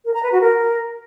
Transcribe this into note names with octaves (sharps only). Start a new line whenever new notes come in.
A#4
A#5
B4
F#4
A#4